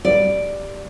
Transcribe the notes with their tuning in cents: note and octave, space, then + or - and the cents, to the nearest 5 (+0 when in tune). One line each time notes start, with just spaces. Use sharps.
G3 +0 D5 +0